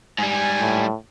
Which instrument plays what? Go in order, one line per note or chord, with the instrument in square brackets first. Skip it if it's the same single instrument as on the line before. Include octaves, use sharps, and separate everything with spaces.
[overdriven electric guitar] G#2 G3 [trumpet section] G#5
[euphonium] A2